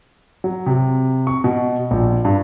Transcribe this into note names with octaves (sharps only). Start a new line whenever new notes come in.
F#3
C3
C#6
B2
A#1
G2